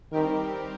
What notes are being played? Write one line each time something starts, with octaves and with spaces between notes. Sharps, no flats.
D#3 G3 C4 G4 A#4